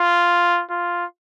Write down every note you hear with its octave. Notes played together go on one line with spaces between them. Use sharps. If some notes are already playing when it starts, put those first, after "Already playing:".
Already playing: F4
F4